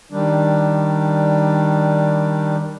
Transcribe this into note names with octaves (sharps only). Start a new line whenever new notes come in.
D#3 G3 D4